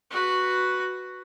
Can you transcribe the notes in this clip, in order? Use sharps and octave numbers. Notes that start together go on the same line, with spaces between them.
F#4 B4